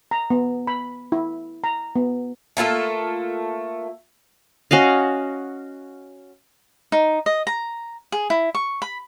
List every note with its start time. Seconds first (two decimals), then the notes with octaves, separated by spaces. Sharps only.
0.11 A#5
0.30 B3
0.67 B5
1.12 E4
1.64 A#5
1.96 B3
2.57 A3 A#3 F4 A4
4.71 C#4 F#4 D#5 F5
6.92 D#4
7.26 D#5
7.47 A#5
8.12 G#4
8.30 E4
8.55 C#6
8.82 B5